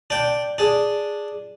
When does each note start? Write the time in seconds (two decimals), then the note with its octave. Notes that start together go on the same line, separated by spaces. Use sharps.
0.10 D4 G5
0.58 D4 G#4